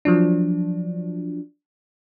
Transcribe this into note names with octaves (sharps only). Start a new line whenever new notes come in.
F3 F#3 D4